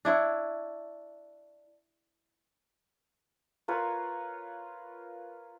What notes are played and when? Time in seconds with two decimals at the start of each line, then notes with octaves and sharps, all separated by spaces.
0.05 D4 E4 C#5
3.68 F4 A#4 B4 C#5